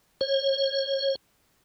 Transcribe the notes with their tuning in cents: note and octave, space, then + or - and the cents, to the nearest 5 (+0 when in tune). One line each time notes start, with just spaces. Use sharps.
C#5 -30